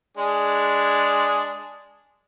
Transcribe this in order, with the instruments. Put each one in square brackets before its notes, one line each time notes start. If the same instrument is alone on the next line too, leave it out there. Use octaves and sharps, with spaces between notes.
[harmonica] G#3 D4 G#4